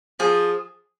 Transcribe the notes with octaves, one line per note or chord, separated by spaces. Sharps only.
F3 G#4